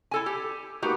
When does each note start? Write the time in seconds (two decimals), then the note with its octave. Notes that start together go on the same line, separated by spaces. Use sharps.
0.11 E4 A4 G#5
0.26 G4
0.82 A#3 B3 D#4 F#4 G4